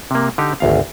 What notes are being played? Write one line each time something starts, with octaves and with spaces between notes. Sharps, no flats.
C3 A#3
D3 D#4 G4
G#1 D2 F5